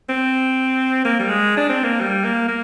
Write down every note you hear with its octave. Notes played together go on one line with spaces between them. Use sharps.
C4
A#3
G3
G#3
D4
C4
A#3
G3
A#3
A#3